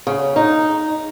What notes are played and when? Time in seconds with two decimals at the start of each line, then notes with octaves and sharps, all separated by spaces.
0.07 C#3
0.36 D#4